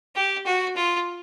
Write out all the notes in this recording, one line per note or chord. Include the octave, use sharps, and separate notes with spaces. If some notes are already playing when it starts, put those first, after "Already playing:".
G4
F#4
F4